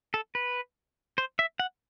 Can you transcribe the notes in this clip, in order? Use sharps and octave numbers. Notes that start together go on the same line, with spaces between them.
A4
B4
C5
E5
F#5